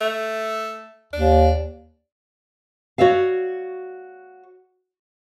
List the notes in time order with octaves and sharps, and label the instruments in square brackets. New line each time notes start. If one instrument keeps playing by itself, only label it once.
[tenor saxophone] A3
[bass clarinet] D#2 [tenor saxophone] D4
[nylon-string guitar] F#4 C#5 D5 E5 F5